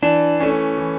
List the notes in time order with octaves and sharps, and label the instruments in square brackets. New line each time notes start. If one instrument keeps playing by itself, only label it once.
[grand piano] E3 [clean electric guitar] D4
[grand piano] A3 C#4
E3